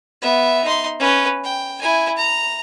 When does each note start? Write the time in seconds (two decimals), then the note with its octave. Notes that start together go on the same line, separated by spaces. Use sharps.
0.21 B3 E5
0.64 D#4 C6
0.99 C#4 B4
1.44 G5
1.81 E4 G#5
2.17 A#5